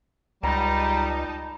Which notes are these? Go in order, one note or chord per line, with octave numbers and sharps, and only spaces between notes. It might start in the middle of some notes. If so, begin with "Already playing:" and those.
C#2 G3 D#4 A5 A#5